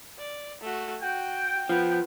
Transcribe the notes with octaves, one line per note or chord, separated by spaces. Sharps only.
D5
A3 F#4
F#4 G5
F3 B3